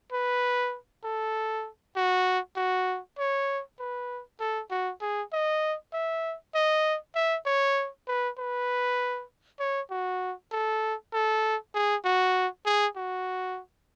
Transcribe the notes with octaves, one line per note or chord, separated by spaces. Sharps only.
B4
A4
F#4
F#4
C#5
B4
A4
F#4
G#4
D#5
E5
D#5
E5
C#5
B4
B4
C#5
F#4
A4
A4
G#4
F#4
G#4
F#4